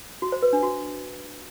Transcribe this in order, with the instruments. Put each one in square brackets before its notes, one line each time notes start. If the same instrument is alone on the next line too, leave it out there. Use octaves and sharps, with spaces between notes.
[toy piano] F#4
C5
B4
D4
F#4